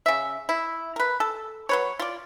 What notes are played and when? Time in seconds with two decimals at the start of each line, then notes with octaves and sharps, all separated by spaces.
0.06 C#3 E5
0.49 E4
0.96 A#4 B4
1.20 A4
1.69 F#3 B4 C#5
1.99 F4 D5